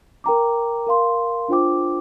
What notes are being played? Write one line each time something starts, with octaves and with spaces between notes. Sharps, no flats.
A#4 G5 A#5 D6
A#4 F5 C6
D4 F4 C5 G5 D6